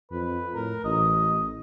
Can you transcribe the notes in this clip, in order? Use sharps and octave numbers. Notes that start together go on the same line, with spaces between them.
F2 B4
A2 A#4
A1 D#5